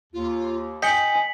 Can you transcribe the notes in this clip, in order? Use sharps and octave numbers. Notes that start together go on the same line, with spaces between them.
D#2 F4
D#5 G5 G#5 B6 C#7 F#7